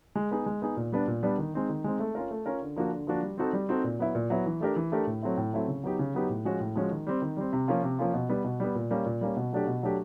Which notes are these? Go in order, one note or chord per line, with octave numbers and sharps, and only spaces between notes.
G#3
B3 D#4 G#4
G#3
B3 D#4 G#4
A#2
G3 B3 D4
A#2
G3 B3 D4
D#3
G#3 C4 D#4
D#3
G#3 C4 D#4
A3
C#4 F4 A#4
A3
C#4 F4 A#4
D3
F3 A#3 D4 F#4
D3
F3 A#3 D4 F#4
G3
C4 D#4 F#4 A4
G3
C4 D#4 F#4 A4
A#2
F#3 B3 E4
A#2
F#3 B3 E4
E3
A3 D4 G4 A#4
E3
A3 D4 G4 A#4
A2
F#3 A3 C4 E4
A2
F#3 A3 C4 E4
C#3
F#3 B3 D#4 G4
C#3
F#3 B3 D#4 G4
A2
F3 G#3 C#4 F#4
A2
F3 G#3 C#4 F#4
D#3
G3 C4
D#3
G3 C4
C3
F3 A#3 C#4 F4
C3
F3 A#3 C#4 F4
B2
G3 B3
B2
G3 B3
A#2
G3 A#3 C#4
A#2
G3 A#3 C#4
B2
F#3 A3 D4 G4
B2
F#3 A3 D4 G4